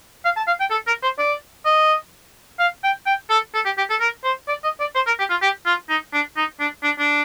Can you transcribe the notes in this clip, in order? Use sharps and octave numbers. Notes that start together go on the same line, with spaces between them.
F5
A5
F5
G5
A4
A#4
C5
D5
D#5
F5
G5
G5
A4
A4
G4
G4
A4
A#4
C5
D5
D#5
D5
C5
A#4
G4
F4
G4
F4
D#4
D4
D#4
D4
D4
D4